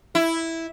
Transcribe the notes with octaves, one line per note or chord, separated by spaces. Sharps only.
E4